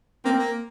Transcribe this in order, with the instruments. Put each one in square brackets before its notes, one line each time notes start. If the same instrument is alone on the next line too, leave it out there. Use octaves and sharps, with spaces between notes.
[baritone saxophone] A#3 [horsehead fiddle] C4
[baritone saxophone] A#3